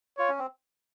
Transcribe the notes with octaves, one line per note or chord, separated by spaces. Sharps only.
F4 C#5
C#4
C4